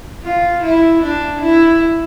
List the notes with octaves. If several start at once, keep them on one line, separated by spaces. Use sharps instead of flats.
F4
E4
D4
E4